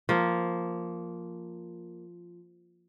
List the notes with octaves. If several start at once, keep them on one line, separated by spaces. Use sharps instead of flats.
F3 A#3